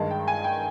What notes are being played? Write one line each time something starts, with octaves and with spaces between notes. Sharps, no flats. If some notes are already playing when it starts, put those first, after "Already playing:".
Already playing: G2 D#3 G#3 A5
G5
G#5
G5